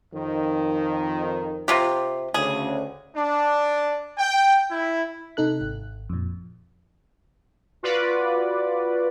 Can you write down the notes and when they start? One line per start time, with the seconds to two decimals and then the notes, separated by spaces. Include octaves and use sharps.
0.13 F2 D#3
1.68 C3 F4 G4
2.34 D2 C#3 G#4
3.16 D4
4.18 G5
4.70 E4
5.37 C3 D#4 A4 F#6
5.61 G#1
6.10 F2 A#2
7.83 F4 F#4 B4 D5